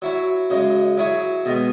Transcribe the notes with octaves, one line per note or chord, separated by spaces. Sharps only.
F#3 E4 C#5
F#2 C#3 G#3
F#3 E4 G#4 C#5
B2 G#3 B3